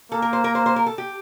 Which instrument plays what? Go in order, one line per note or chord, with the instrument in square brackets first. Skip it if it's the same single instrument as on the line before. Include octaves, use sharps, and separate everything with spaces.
[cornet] A#3 [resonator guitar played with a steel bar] A4
[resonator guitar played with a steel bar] A#4
C5
A#4
C5
C5
A#4
A4
G4